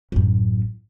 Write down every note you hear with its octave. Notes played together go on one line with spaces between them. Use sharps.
A1 F#2